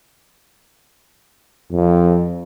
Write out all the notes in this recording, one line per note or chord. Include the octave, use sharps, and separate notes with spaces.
F2